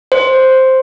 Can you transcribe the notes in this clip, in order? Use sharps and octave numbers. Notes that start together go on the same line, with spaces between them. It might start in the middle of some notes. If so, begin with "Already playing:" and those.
C5